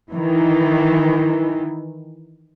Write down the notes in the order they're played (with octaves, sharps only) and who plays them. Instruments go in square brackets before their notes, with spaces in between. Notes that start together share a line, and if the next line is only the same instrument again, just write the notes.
[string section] D#3 E3